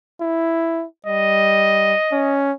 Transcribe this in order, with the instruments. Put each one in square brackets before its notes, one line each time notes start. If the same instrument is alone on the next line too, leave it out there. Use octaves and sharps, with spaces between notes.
[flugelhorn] E4
[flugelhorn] G3 [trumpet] D#5
[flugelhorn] C#4